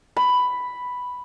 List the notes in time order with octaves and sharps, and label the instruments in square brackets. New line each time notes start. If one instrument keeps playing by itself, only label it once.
[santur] B5